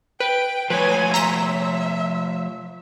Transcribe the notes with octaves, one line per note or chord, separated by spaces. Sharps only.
B4 G5
F3 A3 B4 C#5 G#5
E5 A#5 C6 B6